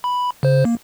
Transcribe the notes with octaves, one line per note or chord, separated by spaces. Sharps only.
B5
C#3 C5
A#3